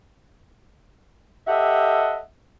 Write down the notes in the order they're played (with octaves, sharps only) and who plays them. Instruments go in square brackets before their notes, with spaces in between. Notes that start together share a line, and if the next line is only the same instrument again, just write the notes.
[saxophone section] G4 A4 D#5 E5 F#5